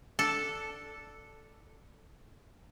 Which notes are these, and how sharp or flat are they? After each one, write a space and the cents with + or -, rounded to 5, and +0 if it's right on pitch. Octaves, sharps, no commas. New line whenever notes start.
D4 +0 A4 +0